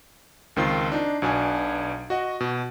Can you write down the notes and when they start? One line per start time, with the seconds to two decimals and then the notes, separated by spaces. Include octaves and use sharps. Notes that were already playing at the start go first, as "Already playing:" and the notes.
0.56 C#2 D#3 C4 F4 C7
0.92 D4 D#4
1.22 B1 B2 D4 G#5
2.10 F#4 D#5 F#5
2.40 B2